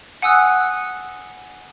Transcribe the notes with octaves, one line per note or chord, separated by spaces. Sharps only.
F#5 G#5 D#6 E6 F#6